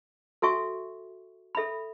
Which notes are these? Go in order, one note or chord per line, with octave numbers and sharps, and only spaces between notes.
F#4 A4 E5 G#5 C#6
A4 E5 B5